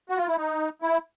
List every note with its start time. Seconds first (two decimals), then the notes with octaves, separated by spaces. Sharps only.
0.09 F#4
0.18 F4
0.27 E4
0.37 D#4
0.82 E4